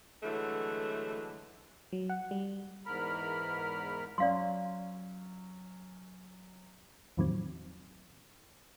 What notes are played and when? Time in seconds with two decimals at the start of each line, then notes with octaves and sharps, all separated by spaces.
0.23 D3 E3 F#3 G#3 A3
1.92 F#3
2.10 F#5
2.31 G3
2.86 E2 G#2 A#4 B5 F6
4.18 F#3 C#4 D5 F5 C6
7.17 E2 A2 D#3 F3 F#3 C4